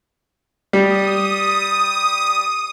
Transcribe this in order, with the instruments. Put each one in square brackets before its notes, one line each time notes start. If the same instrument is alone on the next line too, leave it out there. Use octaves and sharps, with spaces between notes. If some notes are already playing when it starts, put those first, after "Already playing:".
[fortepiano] G3 [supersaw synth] D#6